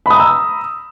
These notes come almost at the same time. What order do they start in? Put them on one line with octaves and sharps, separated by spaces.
B5 D#6 A#5 E6